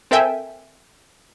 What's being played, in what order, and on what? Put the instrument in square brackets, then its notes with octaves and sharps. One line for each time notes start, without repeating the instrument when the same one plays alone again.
[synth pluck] C4 A4 A#4 E5 G5 G#5